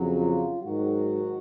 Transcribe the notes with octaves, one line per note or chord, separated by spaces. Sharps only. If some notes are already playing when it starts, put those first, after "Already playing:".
Already playing: F2 C#3 F#3
F4
G#2 D#3 F#3 F#4